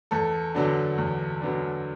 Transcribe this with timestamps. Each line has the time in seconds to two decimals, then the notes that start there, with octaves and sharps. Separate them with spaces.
0.11 E2 A4
0.55 D3 F#3 B3 D4
0.98 E2
1.41 D3 F#3 B3 D4